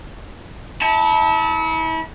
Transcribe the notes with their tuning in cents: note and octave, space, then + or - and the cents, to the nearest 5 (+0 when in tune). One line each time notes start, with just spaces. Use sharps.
E4 -40 A5 +0